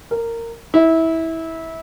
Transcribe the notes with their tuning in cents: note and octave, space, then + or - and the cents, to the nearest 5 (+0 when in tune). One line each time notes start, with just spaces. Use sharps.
A#4 -15
E4 -20